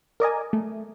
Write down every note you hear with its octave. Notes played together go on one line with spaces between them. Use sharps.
A#4 D5 D#5 G#5
A3